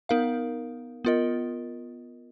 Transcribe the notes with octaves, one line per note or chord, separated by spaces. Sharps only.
B3 D#4 A#4 F5
B3 F4 A#4 D#5